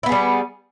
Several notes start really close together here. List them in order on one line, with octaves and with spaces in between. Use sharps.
E4 B3 G#4 G3